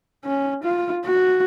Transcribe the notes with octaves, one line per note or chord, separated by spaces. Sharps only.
C#4
F4
F#4